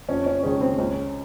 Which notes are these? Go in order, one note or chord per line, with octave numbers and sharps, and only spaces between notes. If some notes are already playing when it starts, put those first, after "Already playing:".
F2 C#4
C#4
D#3 G#3 C#4
C4
C#2 C#4